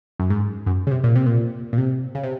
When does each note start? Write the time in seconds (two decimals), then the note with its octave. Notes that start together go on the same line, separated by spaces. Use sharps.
0.19 F#2
0.30 G#2
0.66 F#2
0.87 C#3
0.91 C3
1.04 A#2
1.16 C3
1.26 A#2
1.73 A#2
1.78 C3
2.15 C#3
2.23 C3